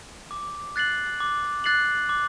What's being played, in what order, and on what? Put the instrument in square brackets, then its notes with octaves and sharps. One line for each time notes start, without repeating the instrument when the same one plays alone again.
[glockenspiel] D6
F#6 A6 C7 F#7
D6
F#6 A6 C7 F#7
D6